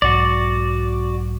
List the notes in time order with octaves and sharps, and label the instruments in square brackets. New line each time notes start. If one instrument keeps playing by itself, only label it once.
[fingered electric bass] B1 G#2 F#3 [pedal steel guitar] F#4 D5